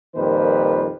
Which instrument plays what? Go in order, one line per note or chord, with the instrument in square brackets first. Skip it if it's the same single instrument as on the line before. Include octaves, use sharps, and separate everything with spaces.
[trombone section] F2 A#2 D#3 G3 B4 C5